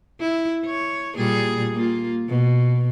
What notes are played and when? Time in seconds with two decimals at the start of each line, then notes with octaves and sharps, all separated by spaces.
0.20 E4
0.65 C#5
1.16 A#2 G3 G#4
1.73 A#3 F4
2.29 B2